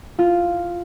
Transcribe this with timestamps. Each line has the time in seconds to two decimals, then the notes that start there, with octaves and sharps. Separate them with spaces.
0.19 F4